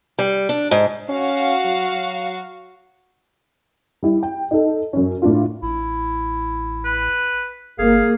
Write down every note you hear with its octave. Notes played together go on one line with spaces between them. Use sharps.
G3
D4
G#2
C#4 F#4 F5
F#3
F#3
G3 E4
G5
D#4 A4
F#2 C#4
A2 D4 F4
A1 E4
B4
G1 A#3 G#4 F5